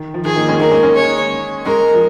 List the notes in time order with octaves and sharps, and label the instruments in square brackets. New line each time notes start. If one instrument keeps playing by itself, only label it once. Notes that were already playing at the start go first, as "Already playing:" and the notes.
Already playing: [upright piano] D#3
F3
[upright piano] D#3 [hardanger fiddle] G#4
[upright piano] A#3 D#4
G#3 C#4
[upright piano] A#3 D#4 [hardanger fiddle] A#4
[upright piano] G#3 C#4
G#3 C#4
[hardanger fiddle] C#5
[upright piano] G#3 C#4 [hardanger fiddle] A#4
[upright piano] F3